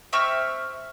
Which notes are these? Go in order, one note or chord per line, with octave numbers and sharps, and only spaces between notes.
C4 E5 C#6 F6